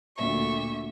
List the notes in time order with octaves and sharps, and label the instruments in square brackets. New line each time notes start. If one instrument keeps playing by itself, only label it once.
[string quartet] D2 A#2 E5 C#6